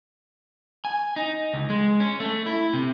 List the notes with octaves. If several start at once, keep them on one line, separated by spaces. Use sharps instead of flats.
G#5
D#4
C#2
G#3
C#4
A3
E4
C3